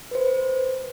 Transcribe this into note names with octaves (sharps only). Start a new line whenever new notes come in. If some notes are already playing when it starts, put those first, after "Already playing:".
B4 C5